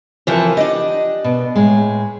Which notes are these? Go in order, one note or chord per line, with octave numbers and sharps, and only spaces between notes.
F2 E3 F3 F4 A#4 C#5
D4 G4 D#5
B2
A2 G#3